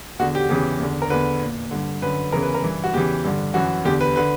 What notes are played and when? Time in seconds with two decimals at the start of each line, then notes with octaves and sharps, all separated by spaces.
0.19 E2 D3 F#4
0.35 G4
0.49 E2 C#3 E3 G4
0.80 E2 D3
1.02 A#4
1.10 E2 D3 B4
1.41 A#2
1.71 G2 D3
2.02 F#2 D3 B4
2.32 E2 C#3 E3 A#4
2.43 B4
2.55 A#4
2.63 G2 E3
2.84 F#4
2.94 E2 C#3 E3 G4
3.24 G2 D3
3.54 F#2 E3 F#4
3.85 E2 D3 G4
4.01 B4
4.16 D3 B4